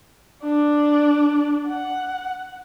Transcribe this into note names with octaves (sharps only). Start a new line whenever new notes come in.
D4
F#5